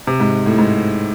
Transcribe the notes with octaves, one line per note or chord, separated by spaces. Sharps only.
C3
G#2
A2
G#2